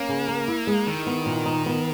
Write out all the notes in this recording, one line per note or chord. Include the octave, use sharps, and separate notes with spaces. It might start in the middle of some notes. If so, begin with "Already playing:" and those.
Already playing: A#3 C#4
C#3
A#4
E4
G#3
D#3 E4
B3
A#2
D#4
B3